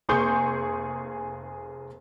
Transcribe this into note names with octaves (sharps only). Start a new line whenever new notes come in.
F1 A#3 G#4 C6 C#6 G6